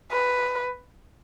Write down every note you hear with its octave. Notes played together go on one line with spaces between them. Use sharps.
B4